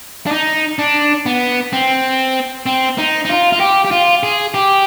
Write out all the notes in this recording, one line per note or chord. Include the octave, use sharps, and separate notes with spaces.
D4
D#4
D4
B3
C4
C4
D#4
D#4
F4
F4
G4
G4
F4
G#4
G4